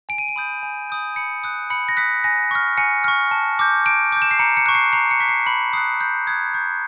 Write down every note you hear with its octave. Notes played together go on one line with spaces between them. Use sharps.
G#5 D7
D#7
D7
B5 D#6 G6
G#5
B5 D#6 G6
B5 C#7
D#6 F#6
B5 C#7
A#6
D#6 F#6 B6
G#5 A#6
C#6 F6
G#5 C#7
C#6 F6
A5
D6 G6
A5 D7
D6 G6
E7
C7
A#5 C#7
C#7
C#6 F#6
C7
A#5 C7
C#7
C#6 F#6 B6
C7
B5 C#7
D#6 F#6 C7
B5 G6
D#6 F#6 G#6
C#6 G6